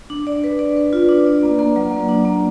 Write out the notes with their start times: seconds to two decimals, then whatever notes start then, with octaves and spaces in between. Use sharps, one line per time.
0.10 D4
0.27 D5
0.44 B4
0.59 D5
0.77 B4
0.93 F4
1.09 D4
1.27 D5
1.43 A#3
1.59 A#3
1.76 F#3
1.92 A#3
2.08 D4
2.25 A#3